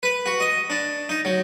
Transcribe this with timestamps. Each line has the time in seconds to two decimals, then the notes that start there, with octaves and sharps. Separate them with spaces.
0.03 B4
0.26 F#4
0.40 D#5
0.70 D4
1.09 D#4
1.25 F#3